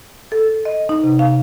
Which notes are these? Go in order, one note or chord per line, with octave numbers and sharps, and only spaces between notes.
A4
D#5
D#4
C3
F5